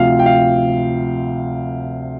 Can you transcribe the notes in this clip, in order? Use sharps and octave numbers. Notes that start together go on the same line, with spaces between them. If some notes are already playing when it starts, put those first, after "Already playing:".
Already playing: D2 C3 F3 F5
G5
F5